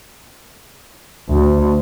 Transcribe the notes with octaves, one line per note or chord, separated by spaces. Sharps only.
D2